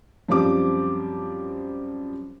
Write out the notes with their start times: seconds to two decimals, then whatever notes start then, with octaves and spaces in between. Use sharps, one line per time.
0.29 F#2 F3 G3 C4 D6